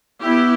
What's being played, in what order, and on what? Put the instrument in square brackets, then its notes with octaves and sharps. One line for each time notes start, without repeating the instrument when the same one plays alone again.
[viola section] B3 E4 G4 [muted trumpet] E5